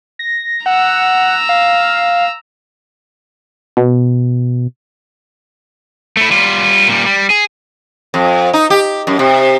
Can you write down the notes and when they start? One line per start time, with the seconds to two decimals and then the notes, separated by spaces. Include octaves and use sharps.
0.19 A#6
0.66 F#5 A#5 E6
1.49 F5
3.77 B2
6.17 A3 E4
6.31 G3 F4
6.88 A#2 G3
7.06 G3
7.30 G#4
8.14 F2
8.54 D#4
8.70 G4
9.07 F#2
9.19 C3